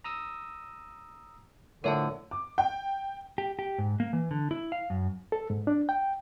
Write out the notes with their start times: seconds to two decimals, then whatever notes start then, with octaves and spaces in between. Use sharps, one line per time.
0.04 A#5 D#6 E6
1.84 A2 D3 F3 A#4 C#5 E5 A5
2.31 D6
2.58 G5
3.38 G4
3.59 G4
3.78 G#2
4.00 A#3
4.13 E3
4.31 D3
4.51 E4
4.72 F5
4.90 F#2
5.32 A4
5.50 G#2
5.67 D4
5.89 G5